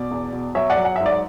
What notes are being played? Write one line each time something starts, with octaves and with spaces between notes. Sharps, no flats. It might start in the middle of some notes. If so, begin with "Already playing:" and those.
Already playing: B2 D5
E2
B2
F#3 C#5 E5
D5 F#5
F#3
F#5
G#2 E5
D5